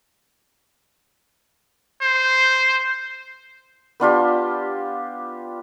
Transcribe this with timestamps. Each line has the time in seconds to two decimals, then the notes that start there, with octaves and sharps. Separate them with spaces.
2.02 C5
4.00 B3 D4 F4 G4